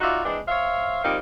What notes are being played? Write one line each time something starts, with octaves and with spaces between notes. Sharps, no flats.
D#4 F4 F#4 D5 E5
E3 G#3 C4 D4
C5 C#5 E5 F5
F3 G3 A#3 C4 D#4